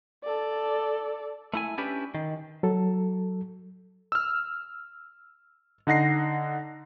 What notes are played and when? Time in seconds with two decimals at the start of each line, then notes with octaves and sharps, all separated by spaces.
0.23 A4 D5
1.54 A3 E4 G#5
1.78 C#4 D4 E4 G4 B4
2.15 D#3
2.63 F#3 A4
4.12 E6 F6
5.87 D3 D#4 F#5 A#6 C7